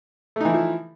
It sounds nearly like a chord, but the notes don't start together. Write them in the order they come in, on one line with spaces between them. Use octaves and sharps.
A3 D#4 E3 E4 F3